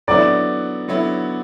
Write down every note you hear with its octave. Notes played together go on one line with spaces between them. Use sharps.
D3 F#3 B3 E4 D5
D3 F#3 B3 E4